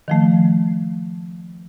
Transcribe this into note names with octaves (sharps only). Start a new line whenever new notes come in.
D#3 F3 A3